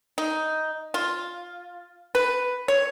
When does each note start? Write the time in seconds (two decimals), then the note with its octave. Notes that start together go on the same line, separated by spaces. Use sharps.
0.18 D#4
0.94 F4
2.15 B4
2.68 C#5